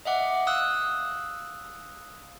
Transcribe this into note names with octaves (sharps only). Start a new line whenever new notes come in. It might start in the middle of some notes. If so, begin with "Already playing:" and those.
D#5 E5 F#5 D6
F5 D#6 E6 F#6